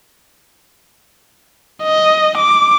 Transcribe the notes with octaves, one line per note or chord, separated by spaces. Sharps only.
D#5
D6